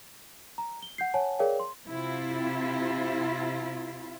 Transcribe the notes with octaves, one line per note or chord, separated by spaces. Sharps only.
A#5
G7
F#5 G6 C7
C#5 F#5 G#5 A5
G#4 A#4 C#5 D5 F5 G5
C6
C3 E4 F4